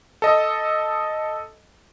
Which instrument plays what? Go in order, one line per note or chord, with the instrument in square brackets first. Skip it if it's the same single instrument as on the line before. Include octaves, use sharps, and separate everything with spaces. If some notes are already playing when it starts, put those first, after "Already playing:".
[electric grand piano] A4 D#5